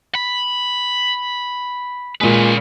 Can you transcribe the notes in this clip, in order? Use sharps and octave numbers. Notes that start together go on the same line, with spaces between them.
B5
A#2 G#3 C#4 B4